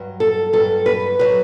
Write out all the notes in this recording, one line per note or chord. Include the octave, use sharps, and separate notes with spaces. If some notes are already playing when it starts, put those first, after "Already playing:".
Already playing: G2 F#3
A4
G2 F#3 A4
B4
F#3 B4